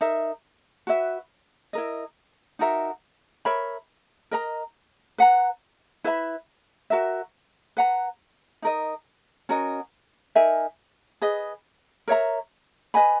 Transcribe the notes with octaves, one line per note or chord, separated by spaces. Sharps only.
D#4 A#4 E5
F#4 B4 E5
E4 A#4 D#5
D#4 F#4 A#4 E5
A#4 C#5 E5 B5
A#4 D#5 A#5
B4 F#5 A#5
E4 B4 E5 B5
F#4 A#4 E5
B4 F#5 A#5
D#4 A#4 D#5
C#4 F#4 A#4 D#5
D#4 A#4 E5 G#5
G#4 B4 D#5
A#4 C#5 E5 A#5
B4 D#5 G#5 B5